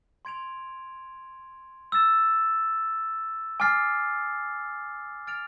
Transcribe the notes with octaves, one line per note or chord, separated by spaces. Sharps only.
C6 G#6 D7 F7
E6 A6 E7
G#5 D6 F6 A6 C7
F6 A6 D7 F7